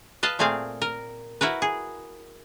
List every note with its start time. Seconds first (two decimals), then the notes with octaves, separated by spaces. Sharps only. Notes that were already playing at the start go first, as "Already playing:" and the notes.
0.23 B4 D#5 F5 A5
0.39 A#2 A3 C4 G#4 F5
0.82 A#4
1.41 E4 F#4 A#4 B4
1.62 G#4